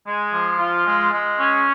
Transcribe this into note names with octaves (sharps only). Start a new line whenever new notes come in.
G#3
F3
F4
G#3
G#3
C#4